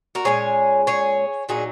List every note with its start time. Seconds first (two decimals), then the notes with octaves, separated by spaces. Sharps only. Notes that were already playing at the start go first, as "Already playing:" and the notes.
0.15 F#4 A#4
0.25 A#2 G#3 C#4 G#4 C#5
0.87 G#4 C#5
1.49 A#2 F#3 D#4 G#4